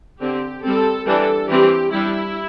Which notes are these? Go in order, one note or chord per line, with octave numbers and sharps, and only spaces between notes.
D3 C4 G4
G3 C4 A4
E3 G3 D4 A4
E3 G3 C4 G4
G3 D4 E4